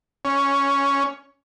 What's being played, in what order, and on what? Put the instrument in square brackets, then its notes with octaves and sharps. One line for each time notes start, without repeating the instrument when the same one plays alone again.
[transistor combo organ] C#4